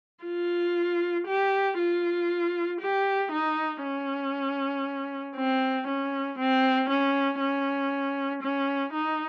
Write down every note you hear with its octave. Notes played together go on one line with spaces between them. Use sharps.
F4
G4
F4
G4
D#4
C#4
C4
C#4
C4
C#4
C#4
C#4
D#4